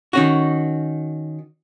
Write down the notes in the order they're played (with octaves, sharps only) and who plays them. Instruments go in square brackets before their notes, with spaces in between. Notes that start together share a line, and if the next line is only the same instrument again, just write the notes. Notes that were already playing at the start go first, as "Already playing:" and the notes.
[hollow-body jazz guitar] D#3 C#4 F#4